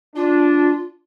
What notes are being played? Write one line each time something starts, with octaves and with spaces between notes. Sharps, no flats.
D4 F4